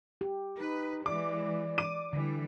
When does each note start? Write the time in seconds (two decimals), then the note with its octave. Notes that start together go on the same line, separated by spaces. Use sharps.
0.21 G4
0.60 D#4 B4
1.06 E3 G#3 D5 D6
1.78 D6 D#7
2.13 D3 E3 G3